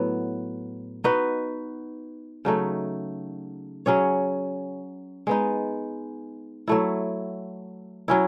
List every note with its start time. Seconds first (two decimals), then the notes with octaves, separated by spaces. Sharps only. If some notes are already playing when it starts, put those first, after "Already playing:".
Already playing: A2 F#3 B3
1.04 B3 D#4 F#4 B4
2.45 C#3 F#3 A3 D#4
3.86 F#3 C#4 G#4 C#5
5.27 G#3 B3 D#4
6.68 F#3 A3 E4
8.08 F#3 C#4 E4